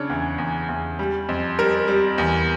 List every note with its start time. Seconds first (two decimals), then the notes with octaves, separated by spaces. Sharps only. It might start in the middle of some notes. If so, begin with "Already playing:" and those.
Already playing: C#3 D4 C#5
0.10 E2
0.38 E2
0.69 E2
0.99 G3
1.29 F2
1.59 G3 A#4
1.88 G3
2.18 E2